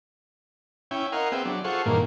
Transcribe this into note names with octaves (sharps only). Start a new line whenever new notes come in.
C#4 E4 G5 G#5
A#4 D#5 F5 F#5 G#5 C6
B3 C4 G#4 E5 G5
F#3 D4
F4 G#4 A4 C5 F#5 C#6
E2 G2 A#2 D#3 A#3